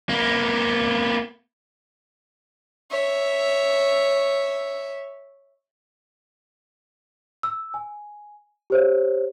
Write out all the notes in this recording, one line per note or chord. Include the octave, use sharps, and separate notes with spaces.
A#3 B3
C#5 E5
E6
G#5
G4 C5 C#5